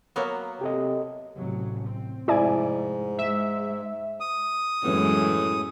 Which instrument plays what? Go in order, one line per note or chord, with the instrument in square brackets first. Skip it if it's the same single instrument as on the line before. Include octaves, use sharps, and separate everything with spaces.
[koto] F#3 A#3 B3
[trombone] C3 [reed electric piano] G4 A4 D#5
[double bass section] A1 C3 F#3
C4
[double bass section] F1 [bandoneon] G#2 [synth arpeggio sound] E4 D5 G#5
[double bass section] G#3 [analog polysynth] E5
[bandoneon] D#6
[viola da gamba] F#2 G#3 [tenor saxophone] A2 [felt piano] E3 B3